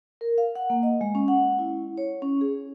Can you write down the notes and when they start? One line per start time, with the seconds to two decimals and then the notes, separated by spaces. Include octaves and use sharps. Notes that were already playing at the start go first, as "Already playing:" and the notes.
0.21 A#4
0.38 F5
0.56 F#5
0.70 A#3
0.83 D#5
1.01 G#3
1.15 C#4
1.28 F#5
1.59 E4
1.98 C#5
2.22 C#4
2.41 G#4